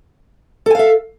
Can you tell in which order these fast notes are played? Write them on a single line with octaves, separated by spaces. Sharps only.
A4 G#5 F5 E5